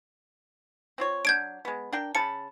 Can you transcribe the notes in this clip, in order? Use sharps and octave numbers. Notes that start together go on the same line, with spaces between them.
C4 F4 C#5
F#3 D4 G6 G#6 D7
G#3 B3
D4 A#4 G5
C#3 A5 B5 C#7